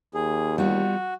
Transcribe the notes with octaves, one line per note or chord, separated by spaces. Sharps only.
D#2 G#4
G3 B3 F4 F#4